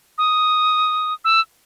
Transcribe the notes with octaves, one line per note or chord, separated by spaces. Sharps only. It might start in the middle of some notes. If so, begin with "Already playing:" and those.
D#6
E6